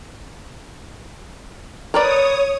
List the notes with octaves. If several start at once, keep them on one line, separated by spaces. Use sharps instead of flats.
A#4 B4 C#5 D5 D#6